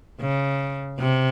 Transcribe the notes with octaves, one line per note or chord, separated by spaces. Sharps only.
C#3
C3